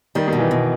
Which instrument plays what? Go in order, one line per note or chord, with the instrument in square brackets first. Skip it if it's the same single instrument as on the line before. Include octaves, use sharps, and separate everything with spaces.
[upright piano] D#3 [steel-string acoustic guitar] G3
[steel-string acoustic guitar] B2 [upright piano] D#3
[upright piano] E3
[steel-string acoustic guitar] B2